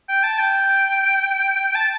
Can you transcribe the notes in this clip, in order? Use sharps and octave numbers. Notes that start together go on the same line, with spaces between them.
G5
A5
G5
A5